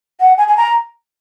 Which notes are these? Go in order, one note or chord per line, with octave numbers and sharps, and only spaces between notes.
F#5
G#5
G#5
A#5